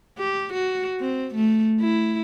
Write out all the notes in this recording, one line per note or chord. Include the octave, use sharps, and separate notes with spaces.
G4
F#4
C4
A3
E4